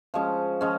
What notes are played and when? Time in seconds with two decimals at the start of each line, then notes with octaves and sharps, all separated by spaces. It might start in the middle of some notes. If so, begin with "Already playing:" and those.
0.14 F3 G#3 C#4
0.61 F3 G#3 C#4